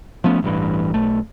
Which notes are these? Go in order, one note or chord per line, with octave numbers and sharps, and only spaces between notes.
F3 A3 B3 C#4
A1 G2 E3
B1 A3